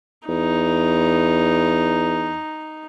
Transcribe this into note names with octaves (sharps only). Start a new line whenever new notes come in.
E2 D#4